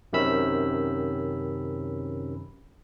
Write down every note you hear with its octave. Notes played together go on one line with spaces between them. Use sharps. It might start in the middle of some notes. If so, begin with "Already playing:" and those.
F#2 C3 D#3 C#4 B5 E6